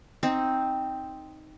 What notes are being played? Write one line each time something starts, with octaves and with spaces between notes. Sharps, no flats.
C4 D#4